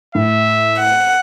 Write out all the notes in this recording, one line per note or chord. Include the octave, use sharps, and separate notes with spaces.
A2 E5
F#5